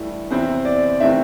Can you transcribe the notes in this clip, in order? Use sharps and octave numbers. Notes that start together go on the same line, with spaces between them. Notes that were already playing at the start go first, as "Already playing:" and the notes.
Already playing: G2 E3 A3 E4
E2 C3 E3 C4 E4 C5
D5
C3 E3 A3 C4 E4 E5